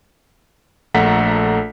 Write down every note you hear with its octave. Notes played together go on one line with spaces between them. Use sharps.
A#1 A3 A4 F#5 A#5 B6